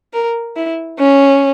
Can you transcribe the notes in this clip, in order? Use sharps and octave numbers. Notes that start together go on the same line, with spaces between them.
A#4
E4
C#4